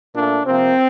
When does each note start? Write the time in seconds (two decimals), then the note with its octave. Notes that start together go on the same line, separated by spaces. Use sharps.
0.14 A#2 A3 D4
0.46 C3 F3 A#3 C4